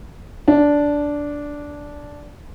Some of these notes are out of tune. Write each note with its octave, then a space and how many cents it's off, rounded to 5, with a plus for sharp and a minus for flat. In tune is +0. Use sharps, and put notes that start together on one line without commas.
D4 -10